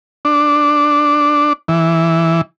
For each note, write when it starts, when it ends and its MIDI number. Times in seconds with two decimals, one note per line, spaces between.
0.25 1.53 62
1.68 2.41 52